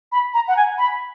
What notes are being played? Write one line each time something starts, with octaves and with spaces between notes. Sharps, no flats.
B5
A#5
F#5
G#5
B5